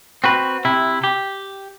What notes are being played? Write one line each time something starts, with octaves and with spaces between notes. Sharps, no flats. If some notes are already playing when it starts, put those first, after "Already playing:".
C4 F#4 B4
C3 E4
G4